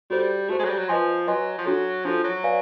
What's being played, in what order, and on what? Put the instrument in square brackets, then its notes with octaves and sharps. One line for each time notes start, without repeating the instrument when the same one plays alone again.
[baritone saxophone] G3 [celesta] F#4 A4 C5
[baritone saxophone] A3 [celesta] F#4 A4 C5
[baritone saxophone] G#3
F#3
G3
F#3
[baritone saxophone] F3 [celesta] B4 D#5 G#5 C6
[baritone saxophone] F#3 [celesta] B4 D#5 G#5 C6
[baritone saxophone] F3
[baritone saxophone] F#3 [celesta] D4 F#4 A4
[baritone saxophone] F3 [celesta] D4 F#4 A4
[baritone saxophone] F#3
[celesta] B4 D5 F5 G#5